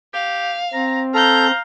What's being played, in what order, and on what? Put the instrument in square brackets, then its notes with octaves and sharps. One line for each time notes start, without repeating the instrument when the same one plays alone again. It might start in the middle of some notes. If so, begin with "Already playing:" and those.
[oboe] G4 [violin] F5
[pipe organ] C4 [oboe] A#5
[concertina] A4 [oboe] F5 [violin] A#5 G6